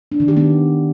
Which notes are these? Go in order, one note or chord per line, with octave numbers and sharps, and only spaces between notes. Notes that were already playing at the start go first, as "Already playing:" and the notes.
D4
D#3
G4
B3